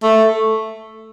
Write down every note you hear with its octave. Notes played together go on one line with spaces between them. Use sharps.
A3